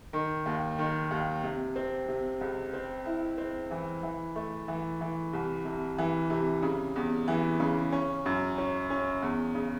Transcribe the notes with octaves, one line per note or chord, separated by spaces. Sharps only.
D#3
D#2
D#3
D#2
C3
C4
C3
C#2
C4
E4
C4
E3
E3
A3
E3
E3
C2
C3
E3
C3
C#3
E2
E3
C#3
C#4
F#2
C#4
C#4
E2
C#3